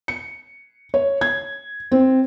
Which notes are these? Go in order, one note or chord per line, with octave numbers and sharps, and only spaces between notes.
C#7
C#5
G#6
C4